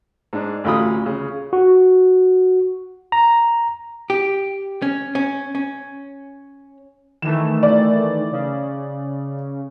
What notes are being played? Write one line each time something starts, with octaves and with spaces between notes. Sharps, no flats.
G#2 D4
A1 D2 F4 B5 D#6
C#3
F#4
A#5
G4
C#4
C#4
C#4
D#3 E3 A3 E7
D5
C#3